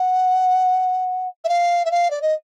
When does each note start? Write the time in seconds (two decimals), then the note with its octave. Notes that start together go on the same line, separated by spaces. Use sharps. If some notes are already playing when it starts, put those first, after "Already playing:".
Already playing: F#5
1.44 E5
1.49 F5
1.85 E5
1.91 F5
2.10 D5
2.22 D#5